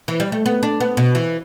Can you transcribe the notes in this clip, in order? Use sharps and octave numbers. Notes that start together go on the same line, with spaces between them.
E3
G3
A3
B3
D4
B3
B2
E3